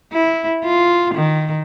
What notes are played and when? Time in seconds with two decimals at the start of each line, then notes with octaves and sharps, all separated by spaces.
0.13 E4
0.64 F4
1.15 D#3